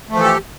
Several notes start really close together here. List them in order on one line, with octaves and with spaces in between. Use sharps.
A3 F3 E3 A4 G4